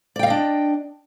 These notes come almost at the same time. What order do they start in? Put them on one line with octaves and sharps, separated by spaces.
D5 G5 F5 D#5 D4